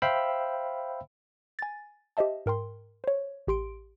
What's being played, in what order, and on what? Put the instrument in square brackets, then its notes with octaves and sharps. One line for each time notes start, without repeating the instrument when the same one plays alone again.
[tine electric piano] C5 E5 F5 G5 B5 E6
[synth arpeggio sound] G#5 A6
G4 C5 D#5 E5 A5
G#2 A#4 G5 C6
C5 C#5
A1 G4 C6 D7